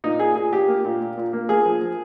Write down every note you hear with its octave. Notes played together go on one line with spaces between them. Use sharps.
A#2 D#4
A#2 G#4
A#2 G#4
A#2 G4
A#3
A#2
A#2
A#2
A#3
A#3 G#4
F3
F3